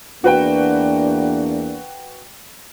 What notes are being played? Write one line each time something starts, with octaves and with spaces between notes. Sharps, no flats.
E2 A#3 D4 F#4 B4 G5